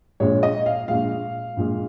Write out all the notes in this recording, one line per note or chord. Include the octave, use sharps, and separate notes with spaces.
A#1 A#2 G#3 C#5
D#5
F5
A#1 A#2 G#3 F5
A#1 A#2 G#3